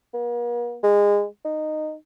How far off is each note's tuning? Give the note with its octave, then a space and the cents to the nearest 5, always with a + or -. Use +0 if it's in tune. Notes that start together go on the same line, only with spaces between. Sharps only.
A#3 +45
G#3 -25
D#4 -15